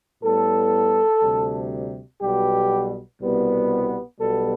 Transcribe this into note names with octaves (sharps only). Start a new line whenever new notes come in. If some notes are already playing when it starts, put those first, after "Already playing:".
A2 G3 B3 A4
D2 C3 G3
B1 B2 G3 B3 G4
C2 B2 G3 B3
B1 B2 G3 B3 A4